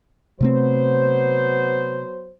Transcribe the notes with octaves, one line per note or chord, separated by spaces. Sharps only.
C3 F#3 A3 B3 C4 C5